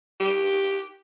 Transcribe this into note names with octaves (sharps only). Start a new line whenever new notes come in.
G4